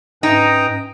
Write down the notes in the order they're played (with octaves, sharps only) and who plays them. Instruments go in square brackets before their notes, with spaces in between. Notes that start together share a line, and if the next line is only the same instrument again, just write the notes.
[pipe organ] G#2 C#4 B4 [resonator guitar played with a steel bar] D#4 [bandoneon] G5 A#5 D#6